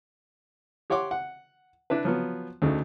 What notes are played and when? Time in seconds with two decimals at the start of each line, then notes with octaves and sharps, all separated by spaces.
0.90 G4 C#5 F#5 C6 D6
1.11 F#5
1.90 D4 E4 B4
2.05 F3 F#3 B3
2.62 D2 C#3 A3 D#4